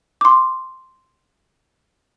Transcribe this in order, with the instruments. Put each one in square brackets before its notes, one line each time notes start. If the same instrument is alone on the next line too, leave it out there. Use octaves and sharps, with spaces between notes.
[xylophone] C6 D6